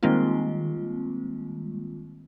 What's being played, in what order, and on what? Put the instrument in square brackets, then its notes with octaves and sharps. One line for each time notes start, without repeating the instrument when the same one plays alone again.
[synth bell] D#3 G3 G#3 A#3 C4 F4